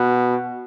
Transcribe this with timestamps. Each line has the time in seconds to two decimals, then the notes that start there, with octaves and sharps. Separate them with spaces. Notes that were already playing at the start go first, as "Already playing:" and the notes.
Already playing: B2